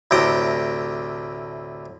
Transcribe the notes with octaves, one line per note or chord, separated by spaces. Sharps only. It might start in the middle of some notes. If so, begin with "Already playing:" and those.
D2 A2 C3 G5 A#5